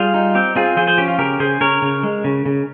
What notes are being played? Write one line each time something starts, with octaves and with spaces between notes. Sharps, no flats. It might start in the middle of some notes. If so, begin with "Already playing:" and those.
Already playing: G3 F4 G#4
D#4
C4 G4
C4 F4 G#4
F3 G#4 C5
G#4 C5
C#4 G4
F4
C#3 G4 A#4
C#3 G#4 C5
C#3 A#4 C#5
C#3
G#3
C#3
C#3